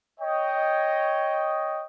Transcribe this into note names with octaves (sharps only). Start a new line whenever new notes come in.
C#5 D#5 G5